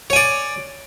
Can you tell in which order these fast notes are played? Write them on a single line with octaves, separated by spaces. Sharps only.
C#5 G#5 D5